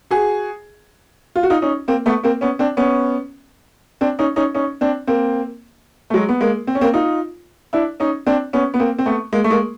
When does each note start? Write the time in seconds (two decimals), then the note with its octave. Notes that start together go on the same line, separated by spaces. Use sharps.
0.11 F#4 G#4
1.35 F4
1.43 F#4
1.50 D#4 F4
1.62 C#4 D#4
1.88 A#3 C4
2.06 A3 B3
2.23 A#3 C4
2.41 B3 C#4
2.59 C4 D4
2.77 B3 C#4
4.01 C4 D4
4.19 C#4 D#4
4.36 C#4 D#4
4.54 C#4 D#4
4.81 C4 D4
5.07 A#3 C4
6.10 A3
6.14 F#3 G#3
6.29 B3
6.41 G#3 A#3
6.67 C4
6.75 C#4
6.81 A#3 C4
6.94 D#4 F4
7.73 D4 E4
8.00 C#4 D#4
8.27 C4 D4
8.53 B3 C#4
8.74 B3
8.80 A#3 C4
8.99 C4
9.06 A3 B3
9.33 G#3 A#3
9.44 A3
9.50 G#3 A#3